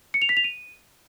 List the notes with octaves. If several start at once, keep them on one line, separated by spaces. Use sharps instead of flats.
C#7
F7
B6
F7
D#7